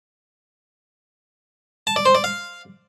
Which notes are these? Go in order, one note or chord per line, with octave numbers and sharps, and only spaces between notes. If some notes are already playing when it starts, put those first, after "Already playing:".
A5
D5
C5
D5
F5